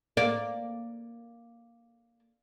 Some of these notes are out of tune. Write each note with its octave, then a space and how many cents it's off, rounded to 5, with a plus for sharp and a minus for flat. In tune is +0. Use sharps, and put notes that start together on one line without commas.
A#3 +0 D5 +0